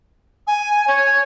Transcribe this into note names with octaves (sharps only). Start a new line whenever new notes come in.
G#5
C#5